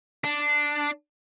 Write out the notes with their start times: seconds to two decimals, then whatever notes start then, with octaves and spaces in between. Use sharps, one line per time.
0.24 D4